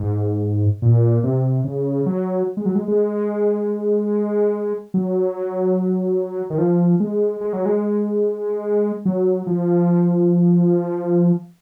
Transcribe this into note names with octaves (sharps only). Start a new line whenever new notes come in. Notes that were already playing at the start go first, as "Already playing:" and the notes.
Already playing: G#2
A#2
C3
C#3
F#3
G#3
F#3
G#3
G#3
F#3
D#3
F3
G#3
G#3
F#3
G#3
F#3
F3